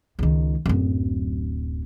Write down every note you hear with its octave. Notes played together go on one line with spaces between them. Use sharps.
C#2 D#3
D1 F#2